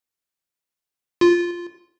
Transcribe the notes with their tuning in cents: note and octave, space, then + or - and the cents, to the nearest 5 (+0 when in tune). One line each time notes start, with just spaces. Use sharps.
F4 -5